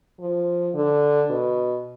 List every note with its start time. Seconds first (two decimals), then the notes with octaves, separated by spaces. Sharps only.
0.20 F3
0.74 D3
1.30 B2